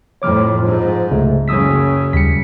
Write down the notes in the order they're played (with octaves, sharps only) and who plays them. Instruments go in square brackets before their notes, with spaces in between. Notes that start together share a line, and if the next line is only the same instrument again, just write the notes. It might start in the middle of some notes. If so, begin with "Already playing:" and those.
[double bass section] F2 A2 [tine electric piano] C#5 D6 F6
[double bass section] G#2 [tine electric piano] F3
[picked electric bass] C#2 [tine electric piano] C3 G#3 A3
[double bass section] F#1 C#3 [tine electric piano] D#6 E6 B6
[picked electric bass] D#2 G3 [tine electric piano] B6 C#7